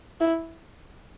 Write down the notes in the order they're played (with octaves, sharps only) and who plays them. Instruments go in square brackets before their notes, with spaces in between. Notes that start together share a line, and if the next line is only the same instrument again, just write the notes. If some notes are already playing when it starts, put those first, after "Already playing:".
[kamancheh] E4